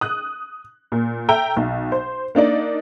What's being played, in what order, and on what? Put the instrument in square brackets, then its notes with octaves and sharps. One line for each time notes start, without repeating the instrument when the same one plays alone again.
[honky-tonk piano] D#6 F#6
A#2
A4 E5 G5 A#5 E6
B1
C5
A#3 D4 D#4 D5